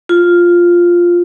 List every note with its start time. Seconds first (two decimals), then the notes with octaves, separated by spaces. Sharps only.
0.09 F4